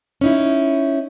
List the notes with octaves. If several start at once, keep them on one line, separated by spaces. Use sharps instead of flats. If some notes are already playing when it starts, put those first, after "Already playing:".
C#4 D#4 E4